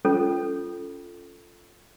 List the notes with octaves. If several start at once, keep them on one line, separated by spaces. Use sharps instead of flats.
C#4 F4 A4